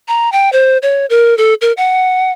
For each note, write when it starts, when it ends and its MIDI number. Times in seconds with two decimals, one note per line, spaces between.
0.08 0.31 82
0.32 0.50 79
0.53 0.78 72
0.82 1.06 73
1.10 1.36 70
1.38 1.54 69
1.61 1.72 70
1.77 2.32 78